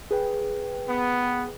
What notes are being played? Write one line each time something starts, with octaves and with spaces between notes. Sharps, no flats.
G#4 B4 G5
B3